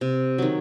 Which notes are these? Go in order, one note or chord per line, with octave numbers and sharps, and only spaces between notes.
C3
D#3 F#3